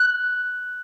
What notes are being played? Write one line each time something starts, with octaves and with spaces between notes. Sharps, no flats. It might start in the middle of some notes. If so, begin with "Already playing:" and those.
Already playing: F#6